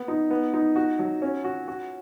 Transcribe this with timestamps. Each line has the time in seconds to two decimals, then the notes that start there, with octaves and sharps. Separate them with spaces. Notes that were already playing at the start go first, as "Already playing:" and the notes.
Already playing: B3
0.08 D#4
0.30 B3
0.54 D#4
0.76 F#4
0.99 F#3
1.22 C#4
1.44 F#4
1.68 F#4